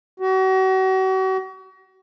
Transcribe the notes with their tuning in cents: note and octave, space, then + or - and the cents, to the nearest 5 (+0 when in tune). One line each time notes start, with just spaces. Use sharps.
F#4 +40